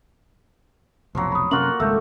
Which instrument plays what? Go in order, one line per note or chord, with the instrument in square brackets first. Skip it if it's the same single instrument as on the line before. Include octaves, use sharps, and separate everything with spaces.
[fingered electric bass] F1 B1 [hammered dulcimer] F3 F#3
[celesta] B5 D#6
[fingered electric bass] F#2 C3 C#4 [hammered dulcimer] A#3 F4 F#4 [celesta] F#7
[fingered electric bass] G#1 C#2 G#3 [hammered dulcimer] A3 [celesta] E6 G6